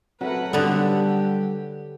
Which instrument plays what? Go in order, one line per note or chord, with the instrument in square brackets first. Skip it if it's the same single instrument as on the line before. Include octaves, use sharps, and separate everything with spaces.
[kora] F#3 A3 A#4 [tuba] C4 [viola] B4 F#5
[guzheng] D3 B3 [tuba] G3 [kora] D4 F#4 A4 [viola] G4